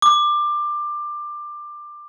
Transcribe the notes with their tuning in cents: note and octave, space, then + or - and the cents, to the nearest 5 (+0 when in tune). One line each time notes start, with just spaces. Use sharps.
D6 +20